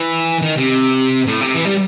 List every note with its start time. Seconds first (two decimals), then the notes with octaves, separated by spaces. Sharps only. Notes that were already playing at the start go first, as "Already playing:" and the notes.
Already playing: E3
0.42 D#3
0.56 C3
1.27 A2
1.41 C3
1.55 E3
1.65 G3